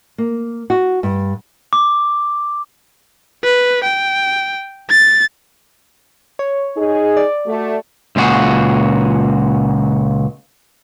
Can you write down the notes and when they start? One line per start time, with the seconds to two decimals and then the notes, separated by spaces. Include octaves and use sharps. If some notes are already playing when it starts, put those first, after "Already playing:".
0.18 A#3
0.70 F#4
1.03 G2
1.73 D6
3.44 B4
3.84 G5
4.90 A6
6.39 C#5
6.77 D#4 G#4
7.17 D5
7.46 A3 F#4
8.16 C#2 A#2 D4 F#4 G#4